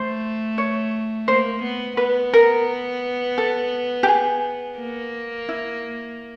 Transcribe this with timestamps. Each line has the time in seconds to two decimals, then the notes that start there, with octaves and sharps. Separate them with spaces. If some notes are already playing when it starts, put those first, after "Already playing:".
Already playing: A3 C5
0.58 C#5
1.28 A#3 C5
1.63 B3
1.97 B3 B4
2.34 A#4
3.38 A4
4.03 G4
4.08 G#4
4.79 A#3
5.49 E4